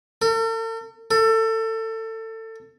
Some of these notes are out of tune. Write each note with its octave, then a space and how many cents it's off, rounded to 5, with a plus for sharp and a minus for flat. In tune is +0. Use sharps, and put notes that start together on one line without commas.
A4 +45
A4 +25